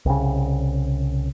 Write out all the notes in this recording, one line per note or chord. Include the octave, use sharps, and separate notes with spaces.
C2 C#3